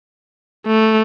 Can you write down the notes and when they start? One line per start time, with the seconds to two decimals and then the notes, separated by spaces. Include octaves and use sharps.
0.66 A3